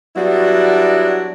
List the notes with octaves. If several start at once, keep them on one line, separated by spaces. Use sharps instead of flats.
F#3 G3 B3 D4 E4 F#4